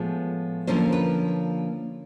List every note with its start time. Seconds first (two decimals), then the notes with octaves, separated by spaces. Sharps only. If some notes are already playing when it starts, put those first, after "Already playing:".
Already playing: A2 F3 G#3 B3
0.67 D3 F3 A#3 C#4 C5
0.93 B4